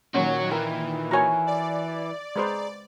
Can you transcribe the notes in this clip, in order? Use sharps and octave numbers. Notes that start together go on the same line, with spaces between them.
A#2 D#3 C#4 F#4 C#5
E3 A#4 G5
F#4 A#4 C#5 G#5 A#5
D5
G#3 G#4 B4 C5 A#5 B5